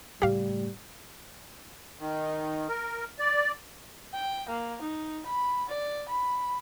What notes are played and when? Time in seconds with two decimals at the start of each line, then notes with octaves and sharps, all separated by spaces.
0.22 F#1 A2 G3 G4 F5
1.99 D#3
2.68 A#4
3.19 D5
4.14 G5
4.48 A#3
4.81 D#4
5.26 B5
5.69 D5
6.08 B5